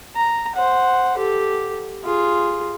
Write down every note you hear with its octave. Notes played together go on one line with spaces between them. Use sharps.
A#5
C5 F#5
G4 A4
F4 G#4